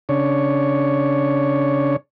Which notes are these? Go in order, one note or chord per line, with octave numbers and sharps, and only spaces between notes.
C#3 D4 C#5